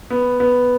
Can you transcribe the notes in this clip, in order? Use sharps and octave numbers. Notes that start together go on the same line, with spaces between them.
B3
B3